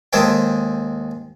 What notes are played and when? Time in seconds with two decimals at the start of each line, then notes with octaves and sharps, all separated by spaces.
0.13 D#2 G#3 G#4 A4 C5 G5